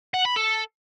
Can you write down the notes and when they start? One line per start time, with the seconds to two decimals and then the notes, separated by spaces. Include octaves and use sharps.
0.14 F#5
0.25 B5
0.36 A4